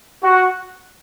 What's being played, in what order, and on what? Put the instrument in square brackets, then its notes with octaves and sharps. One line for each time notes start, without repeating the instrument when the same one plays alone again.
[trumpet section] F#4